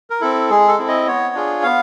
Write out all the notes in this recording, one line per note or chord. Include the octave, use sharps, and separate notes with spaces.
A#4
C4 E4 A4
G#3 G#4
A4
C4 E4
D#5
B3 C#5
D4 F4 G#4
B3 F5